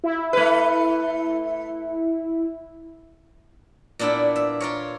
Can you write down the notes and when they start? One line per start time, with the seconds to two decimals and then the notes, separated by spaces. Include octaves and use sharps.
0.04 E4
0.33 A3 B4
3.99 A#2 B3 D4 E4 G5
4.36 E5
4.60 F4 A#4 C#5